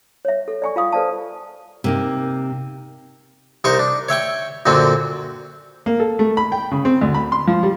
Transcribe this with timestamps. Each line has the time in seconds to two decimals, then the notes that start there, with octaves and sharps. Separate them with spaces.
0.25 C#5 E5
0.48 A4
0.62 D5 G#5 C#6
0.76 F4 F5 D#6
0.92 A4 B4 C5 D5 F5 A5
1.84 C3 A#3 D#4
3.64 C2 D#4 A#4 C5 C#6
3.79 D4
4.09 C#5 E5 G5 C#6
4.66 F#2 A#2 D3 F#3 C4
5.86 A#3
6.00 A4
6.19 A3
6.37 B5
6.52 G5
6.71 C#3
6.85 C4
7.01 D2
7.14 B5
7.32 C6
7.47 F3
7.63 G3